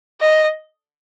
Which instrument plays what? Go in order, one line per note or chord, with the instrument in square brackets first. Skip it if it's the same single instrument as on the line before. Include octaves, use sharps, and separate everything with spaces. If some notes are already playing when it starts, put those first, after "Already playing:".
[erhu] D#5